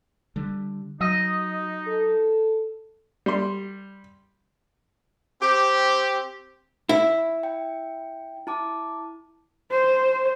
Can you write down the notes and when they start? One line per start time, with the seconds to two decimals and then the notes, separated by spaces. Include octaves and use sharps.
0.36 D3 G3
1.01 F#3 D#4 D#5
1.87 A4
3.26 G3 C6
5.41 C4 G4
6.89 E4
7.43 G5
8.47 E4 A5 D6
9.71 C5